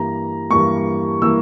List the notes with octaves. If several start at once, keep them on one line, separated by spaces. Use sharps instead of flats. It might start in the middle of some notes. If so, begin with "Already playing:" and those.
Already playing: G2 E3 G3 A#3 A#5
G2 E3 G3 A#3 C#6
E3 G3 A#3 E6